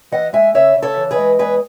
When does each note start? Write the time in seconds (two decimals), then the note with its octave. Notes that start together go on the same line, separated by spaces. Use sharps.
0.12 E3 D#5 F#5
0.33 G#3 E5 G#5
0.54 C#3 C#5 E5
0.76 C#3
0.82 A4 C#5
0.97 E3
1.11 G#4 B4
1.18 G#3
1.39 E2 G#4 B4